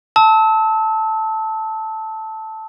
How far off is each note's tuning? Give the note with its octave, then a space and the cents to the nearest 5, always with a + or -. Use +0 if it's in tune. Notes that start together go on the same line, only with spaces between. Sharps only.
A5 +0 E6 -35